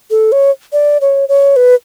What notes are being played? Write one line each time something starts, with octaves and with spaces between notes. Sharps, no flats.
A4
C#5
D5
C#5
C#5
B4